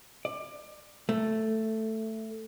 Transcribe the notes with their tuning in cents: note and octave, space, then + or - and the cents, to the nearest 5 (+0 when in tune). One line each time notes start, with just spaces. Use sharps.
D5 +25
A3 +5